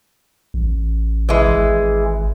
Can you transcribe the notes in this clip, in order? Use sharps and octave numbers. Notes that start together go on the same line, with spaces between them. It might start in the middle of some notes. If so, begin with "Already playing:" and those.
A1
E3 G#3
G#1